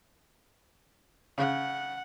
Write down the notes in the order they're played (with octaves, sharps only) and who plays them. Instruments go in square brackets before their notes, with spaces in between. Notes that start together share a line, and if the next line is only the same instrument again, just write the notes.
[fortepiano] C#3 [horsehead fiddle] F#5